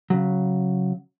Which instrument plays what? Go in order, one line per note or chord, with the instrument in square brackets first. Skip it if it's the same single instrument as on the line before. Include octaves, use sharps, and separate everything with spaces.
[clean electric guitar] C#3 F#3